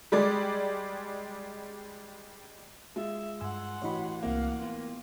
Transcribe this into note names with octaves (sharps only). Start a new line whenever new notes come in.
G3 G#3 D5
G#3 F4 E5
G2 F#5 G#5 C6 E6
A1 E3 F#4 C#5 D#5 B5
C2 A#3 C4 F5 F#5
B3 F4